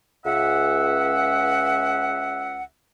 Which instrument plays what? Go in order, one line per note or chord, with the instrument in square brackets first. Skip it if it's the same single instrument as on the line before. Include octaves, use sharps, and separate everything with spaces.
[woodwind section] C#2 E5 F#5